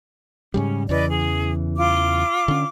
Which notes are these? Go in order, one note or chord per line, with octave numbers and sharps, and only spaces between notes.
G#2 C#3 G3 C#4
E2 C#3 E3 B4 D5 D#5
G#4
F4 D6
D3 C#4